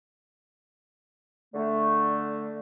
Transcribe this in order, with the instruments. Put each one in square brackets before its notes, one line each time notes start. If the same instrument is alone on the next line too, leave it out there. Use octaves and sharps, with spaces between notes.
[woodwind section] D3 A3